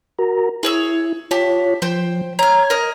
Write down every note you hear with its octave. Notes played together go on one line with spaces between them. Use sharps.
F#4 A#4 A#5
E4 G#4 C#5 E6
F4 G4 C#5 A5
F3 C5 G5
C#5 A#5 F6 G#6
A#4 D#5